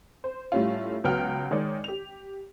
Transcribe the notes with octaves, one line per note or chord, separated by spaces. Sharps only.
C5
A2 G3 A3 C#4 F4
C#2 F#3 B3 F#5 G5 F6
D#3 G#3 C#5 D5
G4 F7